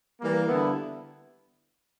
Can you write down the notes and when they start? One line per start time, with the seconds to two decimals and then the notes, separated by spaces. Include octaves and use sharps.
0.19 E3 G3 A#3
0.48 D3 G3 B3 E4